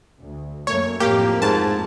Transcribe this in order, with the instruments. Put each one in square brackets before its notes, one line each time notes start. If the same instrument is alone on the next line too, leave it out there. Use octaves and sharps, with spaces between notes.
[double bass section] D2
[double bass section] F#2 A3 A#3 [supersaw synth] C#5
[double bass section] F2 A2 [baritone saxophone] A#3 [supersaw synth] G4
[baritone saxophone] G#2 [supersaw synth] A5